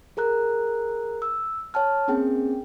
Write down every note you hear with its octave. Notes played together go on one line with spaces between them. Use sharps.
G#4 A#4 A#5 F#6
E6
C#5 G5 A5 F6
A#3 C4 C#4 G#4 G5